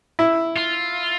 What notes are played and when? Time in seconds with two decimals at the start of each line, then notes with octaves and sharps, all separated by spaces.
0.19 E4
0.56 F4